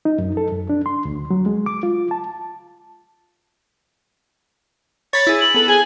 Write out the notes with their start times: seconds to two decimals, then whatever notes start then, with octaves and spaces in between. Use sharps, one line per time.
0.05 D#4
0.19 F#2
0.37 A4
0.52 F#2
0.70 D4
0.86 C6
1.05 D2
1.31 F#3
1.46 G#3
1.66 D6
1.83 F4
2.11 A5
5.13 C#5 B5 C#6 A6
5.27 E4 G#4
5.41 F#7
5.55 B3 A4
5.68 G#4 G#5